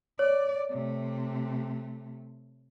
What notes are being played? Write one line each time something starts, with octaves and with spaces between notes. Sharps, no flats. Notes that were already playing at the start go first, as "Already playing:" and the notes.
C#5 D5
C3 A3